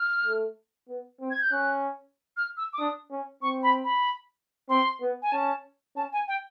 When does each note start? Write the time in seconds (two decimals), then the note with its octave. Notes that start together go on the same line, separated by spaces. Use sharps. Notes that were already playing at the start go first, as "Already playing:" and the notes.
Already playing: F6
0.24 A3
0.88 B3
1.20 C4
1.30 G#6
1.41 G6
1.51 C#4 F#6
2.37 F6
2.57 E6
2.73 D6
2.78 D4 D#6
3.11 C#4
3.42 C4 C#6
3.63 B5
3.84 B5
4.69 C4 C6
5.00 B3
5.22 G#5
5.32 C#4 A5
5.96 C#4 A5
6.12 G#5
6.28 G5